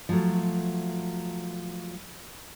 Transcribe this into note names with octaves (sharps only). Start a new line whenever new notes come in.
F3 F#3 A3